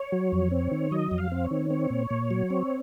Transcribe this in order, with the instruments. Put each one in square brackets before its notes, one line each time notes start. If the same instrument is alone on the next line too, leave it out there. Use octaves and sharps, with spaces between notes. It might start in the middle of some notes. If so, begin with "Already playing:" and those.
Already playing: [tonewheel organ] C#5
F#3
F2
C4
D#3
F#3 D#5
F2
F5
C4
C#5
D#3
C4
A#2
A#2
F#3
C4